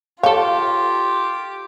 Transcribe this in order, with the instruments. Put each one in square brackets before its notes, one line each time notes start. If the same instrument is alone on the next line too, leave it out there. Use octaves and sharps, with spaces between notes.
[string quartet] F4 [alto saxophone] G4 [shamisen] A4 C#5 [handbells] F5